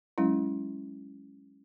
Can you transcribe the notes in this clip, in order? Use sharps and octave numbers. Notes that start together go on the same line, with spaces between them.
F#3 G#3 C#4 E4